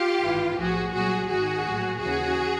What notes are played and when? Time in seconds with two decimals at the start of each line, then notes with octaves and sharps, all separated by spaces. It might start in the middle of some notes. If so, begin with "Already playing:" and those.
Already playing: F4 G4
0.22 G#1 G2 E3
0.57 B1 A2 F3 F#4 G#4
0.93 C2 A#2 F#3 F#4 G#4
1.28 G#1 G#2 D#3 F#4 G#4
1.64 A#1 A2 F#3
2.00 D#2 C#3 E3 F#4 G#4